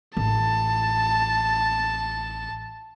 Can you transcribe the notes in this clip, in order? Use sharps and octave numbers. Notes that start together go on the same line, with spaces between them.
A1 A5